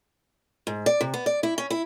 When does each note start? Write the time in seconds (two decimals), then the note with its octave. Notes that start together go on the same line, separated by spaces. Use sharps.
0.67 G#2
0.86 D5
1.01 C3
1.14 B3
1.26 D5
1.43 E4
1.58 C#4
1.70 E4